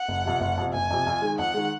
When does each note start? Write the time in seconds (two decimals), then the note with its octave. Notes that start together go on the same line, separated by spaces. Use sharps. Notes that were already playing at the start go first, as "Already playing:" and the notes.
Already playing: F#5
0.08 F#1
0.25 F2 C3
0.41 F#1
0.57 F2 C3
0.73 F#1 G#5
0.90 F2 C3
1.06 F2
1.22 D#3 G#3
1.39 F2 F#5
1.54 D#3 G#3